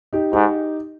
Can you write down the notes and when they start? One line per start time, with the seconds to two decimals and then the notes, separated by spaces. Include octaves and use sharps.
0.13 D#4 G4
0.33 G#2 D#4 G4